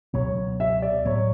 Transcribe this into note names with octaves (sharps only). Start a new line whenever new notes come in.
C#2 B2 F#3 B3 C#5
E5
D5
A2 F#3 B3 C#5